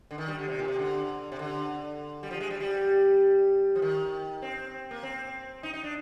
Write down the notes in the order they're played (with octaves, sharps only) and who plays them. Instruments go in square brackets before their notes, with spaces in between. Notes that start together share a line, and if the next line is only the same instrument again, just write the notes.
[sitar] D3
D#3
G3
D3
C3
A#2
C3
D3
C3
D3
G3
F3
G#3
G3
G3
F3
D#3
C4
A#3
C4
D#4
D#4
D4